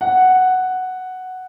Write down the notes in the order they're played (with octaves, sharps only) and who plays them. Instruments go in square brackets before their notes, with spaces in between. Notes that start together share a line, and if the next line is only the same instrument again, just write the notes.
[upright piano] F#5